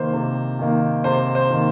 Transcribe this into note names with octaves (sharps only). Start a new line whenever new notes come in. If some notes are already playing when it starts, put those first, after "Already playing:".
Already playing: C3 D#3 A#3 C5
C3
D#3 A#3
C3 C5
C5
D#3 A#3